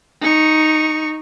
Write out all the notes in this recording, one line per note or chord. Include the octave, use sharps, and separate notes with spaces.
D#4 C#6